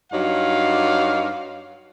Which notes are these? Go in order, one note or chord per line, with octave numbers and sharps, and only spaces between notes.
G2 F#3 D#4 F5